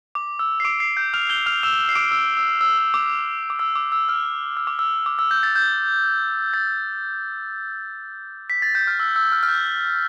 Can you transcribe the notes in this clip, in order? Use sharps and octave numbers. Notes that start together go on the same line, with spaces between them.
D6
E6
C7
D6 D7
C7
G6
F6 F7
G6 G7
F6 F7
E6 E7
C7
D6 D7
E6
E6
E6
E6
D6
D6
E6
D6
E6
F6
E6
D6
E6
D6
E6
G6
A6
G6
A6
B6
A6
G6
F6
E6
E6
F6
F6
G6